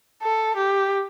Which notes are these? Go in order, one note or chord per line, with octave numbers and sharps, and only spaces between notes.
A4
G4